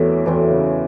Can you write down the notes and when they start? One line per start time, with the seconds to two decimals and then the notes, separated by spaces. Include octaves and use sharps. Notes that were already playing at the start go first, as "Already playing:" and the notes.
Already playing: E2 A2 E3 F#3 C4
0.26 E2 A2 E3 F#3 C4
0.50 C#3